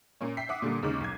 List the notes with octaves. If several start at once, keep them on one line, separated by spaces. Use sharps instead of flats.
A#2 A#3 C#4
E5 G5 B6 C7
E5 F#5 D6 D#6
A#2 D3 G3 A#3
D#2 C#3 G#3 D6
B1 G#6